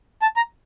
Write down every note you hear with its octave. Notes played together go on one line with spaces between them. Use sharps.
A5
A#5